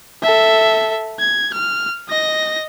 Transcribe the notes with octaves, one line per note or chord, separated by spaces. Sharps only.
A4 E5
G#6
F6
D#5 A#6